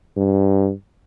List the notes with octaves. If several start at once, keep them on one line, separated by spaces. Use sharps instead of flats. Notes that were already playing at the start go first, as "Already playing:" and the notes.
G2